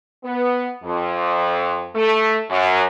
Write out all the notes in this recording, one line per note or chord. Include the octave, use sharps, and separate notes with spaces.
B3
F2
A3
F#2